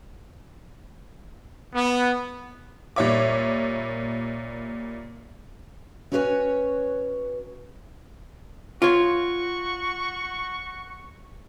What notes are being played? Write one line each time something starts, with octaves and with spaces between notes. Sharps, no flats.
B3
A#2 G3 C#5 E5 D6
C#4 F#4 B4 C#5 E5 G#5
F4 F#4 C#5 C#6